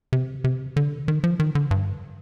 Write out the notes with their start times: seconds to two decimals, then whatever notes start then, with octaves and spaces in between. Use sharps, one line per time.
0.13 C3
0.44 C3
0.76 D3
1.08 D#3
1.24 F3
1.40 D#3
1.55 D3
1.71 G2